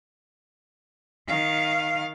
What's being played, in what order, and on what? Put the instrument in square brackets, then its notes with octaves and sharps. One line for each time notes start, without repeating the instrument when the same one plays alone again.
[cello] D#3 F5